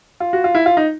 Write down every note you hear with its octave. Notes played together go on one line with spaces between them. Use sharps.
F4
F#4
F4
E4
F4
D#4